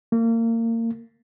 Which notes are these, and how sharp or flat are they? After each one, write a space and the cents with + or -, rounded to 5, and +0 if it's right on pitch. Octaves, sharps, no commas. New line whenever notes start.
A#3 -30